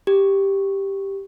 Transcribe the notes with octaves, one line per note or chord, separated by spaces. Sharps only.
G4